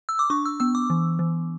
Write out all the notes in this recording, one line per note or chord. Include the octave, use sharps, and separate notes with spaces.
E6
D6
D4 C#6
E6
B3 E6
D6
E3
E3